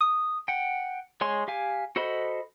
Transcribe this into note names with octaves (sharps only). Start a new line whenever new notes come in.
D#6
F#5 G5
G#3 C#5 G#5 C6
G4 F5 G#5
F#4 A4 C5 D#5 B5